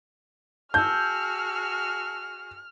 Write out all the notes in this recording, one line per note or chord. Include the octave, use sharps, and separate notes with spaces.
F#4 G#4 A5 E6 F6 G6